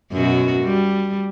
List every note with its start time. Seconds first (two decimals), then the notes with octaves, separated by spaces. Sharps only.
0.12 F#2 B2 F#4
0.63 G3